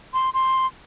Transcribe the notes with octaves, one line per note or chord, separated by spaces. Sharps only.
C6
C6